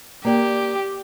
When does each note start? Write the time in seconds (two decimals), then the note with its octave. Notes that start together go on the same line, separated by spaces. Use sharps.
0.25 A#3 G4 D5 G5